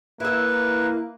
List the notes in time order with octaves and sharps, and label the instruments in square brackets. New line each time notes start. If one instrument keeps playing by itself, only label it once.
[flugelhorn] A#3 [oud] E4 E5 [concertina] B4